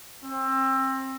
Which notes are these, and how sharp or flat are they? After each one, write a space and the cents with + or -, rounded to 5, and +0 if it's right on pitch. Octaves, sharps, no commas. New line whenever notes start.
C4 +25